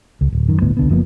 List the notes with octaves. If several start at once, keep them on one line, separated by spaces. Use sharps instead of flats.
C#2
D1
F#2 D#3
D1 G1 A2 B3
C#2 D3 B3
F#1 F3 A#3 B3